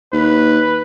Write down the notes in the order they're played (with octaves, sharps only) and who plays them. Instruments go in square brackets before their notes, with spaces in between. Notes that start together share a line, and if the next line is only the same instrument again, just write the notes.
[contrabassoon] D#2 [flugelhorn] B4